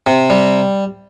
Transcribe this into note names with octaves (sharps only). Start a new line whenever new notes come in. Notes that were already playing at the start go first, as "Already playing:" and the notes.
C3
G3